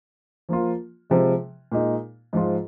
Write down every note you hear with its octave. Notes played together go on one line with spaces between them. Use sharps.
F3 A#3 F4
C3 F3 G#3
A#2 G#3 D#4
G#2 F3 G#3 F4